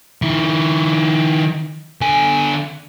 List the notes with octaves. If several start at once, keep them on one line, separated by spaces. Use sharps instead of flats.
D#3 E4
D3 G#5